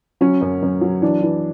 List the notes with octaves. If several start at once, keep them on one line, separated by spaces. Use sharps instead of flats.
F#3 C#4
F#2
F#2
F#3
E3 D4
E3